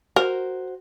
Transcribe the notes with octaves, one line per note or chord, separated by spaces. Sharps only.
F#4 A#4 C5